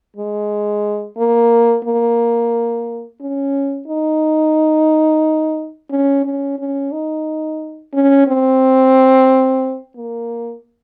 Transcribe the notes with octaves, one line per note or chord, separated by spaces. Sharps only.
G#3
A#3
A#3
C#4
D#4
C#4
C#4
C#4
D#4
C#4
C4
A#3